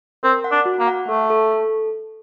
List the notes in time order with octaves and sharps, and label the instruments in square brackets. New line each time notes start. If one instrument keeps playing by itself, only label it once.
[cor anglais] C4 [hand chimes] A#4
[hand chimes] F#5
[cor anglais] D4
[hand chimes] F#4
[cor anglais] A#3
[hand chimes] F#5
[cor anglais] A3 [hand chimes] A4
[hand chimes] A4
A4